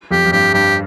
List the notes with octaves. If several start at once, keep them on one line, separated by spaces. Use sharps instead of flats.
F2 G4
F2
G2 G4
G2 G4